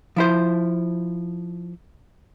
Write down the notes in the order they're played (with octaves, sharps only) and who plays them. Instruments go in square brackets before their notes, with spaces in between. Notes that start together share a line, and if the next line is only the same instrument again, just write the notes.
[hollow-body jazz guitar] F3 E4 C5